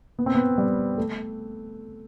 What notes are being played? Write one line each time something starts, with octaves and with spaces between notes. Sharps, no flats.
B3
C4
B3
G3
A3